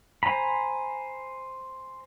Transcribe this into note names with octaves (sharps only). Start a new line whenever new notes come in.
C5 G#5 A#5 B5